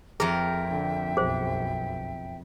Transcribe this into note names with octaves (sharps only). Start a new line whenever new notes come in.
F2 G#4 A#4 E5 G5
D3
B1 F#2 G#4 C5